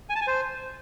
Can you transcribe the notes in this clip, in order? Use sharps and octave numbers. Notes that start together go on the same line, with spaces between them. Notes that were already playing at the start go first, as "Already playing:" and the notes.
G#5
A5
G#5
C5